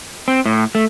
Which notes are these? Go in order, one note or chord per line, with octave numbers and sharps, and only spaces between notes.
C4
A2
A3